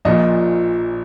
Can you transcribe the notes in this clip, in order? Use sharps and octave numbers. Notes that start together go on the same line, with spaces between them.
A#1 A#2 F3 D#5